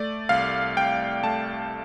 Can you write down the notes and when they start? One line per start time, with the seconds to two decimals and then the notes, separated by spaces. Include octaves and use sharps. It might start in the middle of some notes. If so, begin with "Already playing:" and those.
Already playing: A3 D5
0.29 C2 F5
0.77 C2 G5
1.24 A3 A5